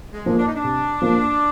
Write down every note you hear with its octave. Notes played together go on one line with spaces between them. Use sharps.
G#3
F3 A#3
D4
D#4
D4
C3
F3 A#3